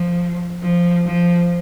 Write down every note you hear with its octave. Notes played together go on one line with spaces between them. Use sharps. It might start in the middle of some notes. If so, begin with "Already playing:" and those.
Already playing: F3
F3
F3